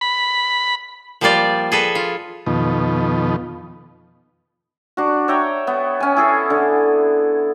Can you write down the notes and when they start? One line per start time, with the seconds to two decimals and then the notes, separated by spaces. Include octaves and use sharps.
0.01 B5
1.21 F3 G3 A#3 F4 D5
1.72 G#4 A4 B4
1.95 F4
2.46 F2 B2 D#3
4.97 D4 F#4
5.28 C#5 E5 G5 A#5
5.67 B3
6.00 C#4 G#5
6.17 E4 G#4 A4
6.50 D3